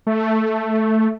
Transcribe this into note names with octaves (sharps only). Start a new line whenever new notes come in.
A3